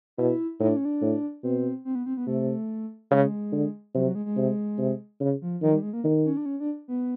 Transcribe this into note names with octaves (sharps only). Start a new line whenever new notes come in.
B2 E4
A2 D#4
D4
C#4
D4
A2
B2 C4
C4
B3
C4
B3
C3 A3
C#3 G#3
D3
C3 F#3
F#3
G#3
G#3
C3
C3
C#3
F3
D#3 F3
G3
G#3
A#3
D#3
C#4
D4
C#4
D4
B3